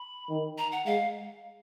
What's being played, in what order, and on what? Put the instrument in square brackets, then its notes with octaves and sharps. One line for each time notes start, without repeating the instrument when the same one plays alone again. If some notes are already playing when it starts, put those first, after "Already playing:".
Already playing: [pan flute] B5
[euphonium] D#3
[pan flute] A#5
F#5
[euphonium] G#3 [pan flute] F5